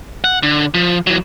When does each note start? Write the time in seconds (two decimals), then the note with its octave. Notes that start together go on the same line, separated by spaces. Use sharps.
0.24 F#5
0.43 D3
0.74 F3
1.07 E3 F#3